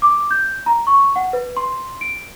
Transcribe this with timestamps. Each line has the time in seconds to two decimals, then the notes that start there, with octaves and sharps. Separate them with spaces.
0.02 D6
0.31 G6
0.66 A#5
0.87 C#6
1.16 F#5
1.33 B4
1.57 C6
2.01 D7